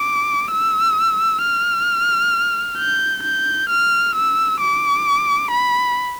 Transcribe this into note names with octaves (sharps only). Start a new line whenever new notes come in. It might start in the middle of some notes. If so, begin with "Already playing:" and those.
Already playing: D6
E6
F6
G6
G6
F6
E6
D6
B5